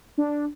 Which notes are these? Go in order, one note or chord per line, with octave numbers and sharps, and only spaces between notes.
D4